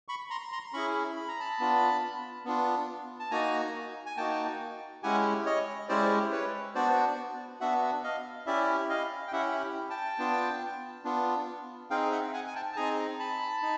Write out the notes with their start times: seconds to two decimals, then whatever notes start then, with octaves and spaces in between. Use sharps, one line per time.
0.08 B5 C#6
0.30 A#5 C6
0.52 A#5 C6
0.73 C#4 E4 G#4 B5 C#6
1.17 B5
1.28 A#5
1.40 A5 B5
1.60 B3 D4 F4
2.45 B3 D4 F4
3.19 A5
3.31 A#3 D#4 F#4 G#5 A#5
4.06 G#5
4.17 A#3 D#4 F#4 G5 A5
5.03 G#3 C#4 E4 G4 F#5 G#5
5.46 C#5 D#5
5.89 G#3 C#4 E4 G4 C5 D5
6.32 B4 C#5
6.75 B3 D4 F#4 C5 D5
7.61 B3 D4 F#4 E5 F#5
8.04 D#5 F5
8.47 C#4 E4 G4 D5 E5
8.89 D#5 F5
9.28 G5
9.32 C#4 E4 G4 E5 F#5
9.90 G5 A5
10.19 B3 D4 F4
11.04 B3 D4 F4
11.90 C4 D#4 G#4 F5 G5
12.12 E5 F#5
12.33 F#5 G#5
12.47 G#5
12.55 G5 A5
12.72 A5
12.76 C4 D#4 G#4 G#5 A#5
13.19 A5 B5
13.62 D#4